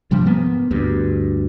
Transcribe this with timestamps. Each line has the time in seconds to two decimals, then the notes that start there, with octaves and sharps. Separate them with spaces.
0.11 G2 C3 F3 G3
0.25 G#2 A#3 B3
0.71 D2 G2